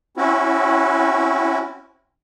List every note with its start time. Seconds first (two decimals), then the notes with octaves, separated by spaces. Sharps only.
0.17 C4 C#4 E4 F#4